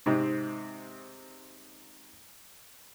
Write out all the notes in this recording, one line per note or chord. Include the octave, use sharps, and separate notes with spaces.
G#2 C3 C4 D#4